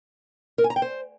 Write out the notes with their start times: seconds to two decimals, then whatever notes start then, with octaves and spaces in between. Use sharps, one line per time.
0.58 A#4
0.64 G#5
0.70 A#5
0.76 G5
0.82 C5